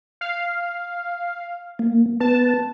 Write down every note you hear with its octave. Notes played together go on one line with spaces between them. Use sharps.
F5
A#3
B3 B4 A5